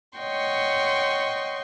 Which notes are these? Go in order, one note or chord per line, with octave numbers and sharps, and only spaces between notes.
C#5 D#5 F#5 G5 C6 C#6